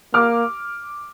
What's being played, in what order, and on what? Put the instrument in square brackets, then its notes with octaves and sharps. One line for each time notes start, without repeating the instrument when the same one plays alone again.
[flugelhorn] A#3 [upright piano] D6 F6